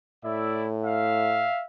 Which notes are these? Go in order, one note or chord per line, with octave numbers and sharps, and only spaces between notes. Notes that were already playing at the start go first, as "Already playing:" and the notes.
A2 E4 D5 E5
E5 F5